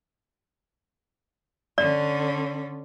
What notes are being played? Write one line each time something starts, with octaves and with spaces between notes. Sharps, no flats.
D3 C#4 D5